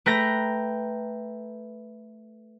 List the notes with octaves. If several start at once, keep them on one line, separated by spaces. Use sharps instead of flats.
A3 B4 G5 A#5 A#6